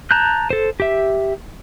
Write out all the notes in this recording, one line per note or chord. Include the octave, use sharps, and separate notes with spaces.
A5 A#5 F#6 G6
A4 C5
G4 E5